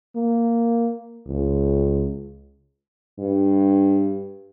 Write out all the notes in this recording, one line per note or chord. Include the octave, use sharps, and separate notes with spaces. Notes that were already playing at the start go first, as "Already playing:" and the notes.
A#3
C#2
G2